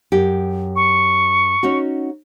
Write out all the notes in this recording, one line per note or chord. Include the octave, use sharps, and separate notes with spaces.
F#2 G4
C#6
C#4 D#4 F#4